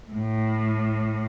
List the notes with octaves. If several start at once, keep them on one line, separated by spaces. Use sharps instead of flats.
A2